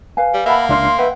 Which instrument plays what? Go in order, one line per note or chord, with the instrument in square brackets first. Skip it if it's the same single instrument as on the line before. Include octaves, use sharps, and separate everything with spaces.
[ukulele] B4 F5 G#5
[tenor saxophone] G3
[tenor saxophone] A#3 [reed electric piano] E5 F#5 A5 [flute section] B5
[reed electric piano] C#2 D4 F6 [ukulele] E5 [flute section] C6
[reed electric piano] B4 E5 G5 [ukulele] F#5